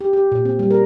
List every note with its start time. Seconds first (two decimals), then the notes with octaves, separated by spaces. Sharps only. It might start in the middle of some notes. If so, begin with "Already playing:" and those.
0.01 G4
0.13 G4
0.32 A#2
0.45 C4
0.59 G3
0.71 A#4